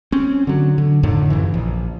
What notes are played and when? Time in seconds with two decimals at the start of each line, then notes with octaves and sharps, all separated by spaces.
0.12 C4 C#4
0.47 D3 F#3
0.78 D3
1.03 F2 A2 D3 D#3
1.30 F1 F#2 E3
1.54 A#1